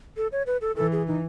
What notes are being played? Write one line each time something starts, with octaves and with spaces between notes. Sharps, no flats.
A4
C#5
B4
A4
E3 A4
G#4
D#4